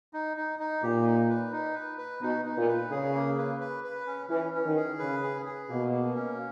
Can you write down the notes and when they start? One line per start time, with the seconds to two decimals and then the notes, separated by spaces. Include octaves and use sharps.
0.14 D#4
0.37 D#4
0.59 D#4
0.83 A#2 G4
1.05 D#4
1.29 B4
1.52 D#4
1.75 B4
1.98 B4
2.21 B2 D#4
2.45 D#4
2.57 A#2
2.68 B4
2.91 C#3 G#4
3.15 A#3
3.38 B4
3.60 B4
3.84 B4
4.06 C#4
4.30 E3 C#4
4.54 C#4
4.65 D#3
4.77 G#4
4.99 C#3 B4
5.23 G#4
5.46 G#4
5.69 B2 A#3
5.92 A#3
6.15 C#4